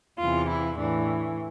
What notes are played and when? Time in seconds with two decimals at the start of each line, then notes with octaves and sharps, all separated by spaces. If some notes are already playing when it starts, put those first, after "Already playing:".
0.19 E2 C3 E3 F4
0.48 E4
0.77 A2 E3 D4